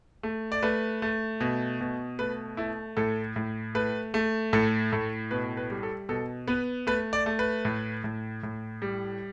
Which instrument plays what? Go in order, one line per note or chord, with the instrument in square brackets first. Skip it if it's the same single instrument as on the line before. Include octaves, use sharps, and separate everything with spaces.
[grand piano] A3
D5
A3 B4
A3
B2
B2
A3 B4
A3 E4
A2 A4
A2
A3 B4
A3
A2 A4
A2 A4
B2 B4
B4
G3
A4
B2 A4
B3 B4
A3 B4
D5
A3
B4
A2
A2
A2
G3